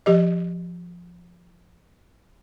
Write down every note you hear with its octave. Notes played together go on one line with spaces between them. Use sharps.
F3 G4 D#5